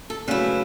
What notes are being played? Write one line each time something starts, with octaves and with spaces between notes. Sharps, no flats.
A4
C#3 F#3 A3 E4 B4